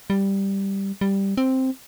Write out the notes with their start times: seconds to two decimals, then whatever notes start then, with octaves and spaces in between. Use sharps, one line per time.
0.10 G3
1.01 G3
1.37 C4